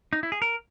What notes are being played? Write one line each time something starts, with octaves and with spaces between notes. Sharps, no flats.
D#4
E4
G#4
A#4